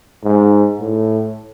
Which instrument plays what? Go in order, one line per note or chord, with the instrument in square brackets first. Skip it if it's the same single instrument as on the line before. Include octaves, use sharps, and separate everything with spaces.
[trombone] G#2
A2